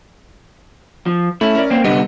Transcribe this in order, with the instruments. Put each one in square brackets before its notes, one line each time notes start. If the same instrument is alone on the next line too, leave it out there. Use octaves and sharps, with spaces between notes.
[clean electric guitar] F3
[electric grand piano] A3 C#4 [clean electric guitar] E4
[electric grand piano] C#4 A#4 D5
[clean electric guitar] A#3 C4
[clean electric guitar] C2 D3 B3 [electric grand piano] G3 D#5